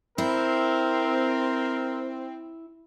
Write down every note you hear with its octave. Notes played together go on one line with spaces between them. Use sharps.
C4 E4 A#4